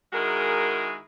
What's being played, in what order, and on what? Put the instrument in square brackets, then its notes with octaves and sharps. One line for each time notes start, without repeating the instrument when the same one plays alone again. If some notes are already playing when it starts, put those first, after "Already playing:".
[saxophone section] D#3 G#3 E4 F#4 G#4 A#4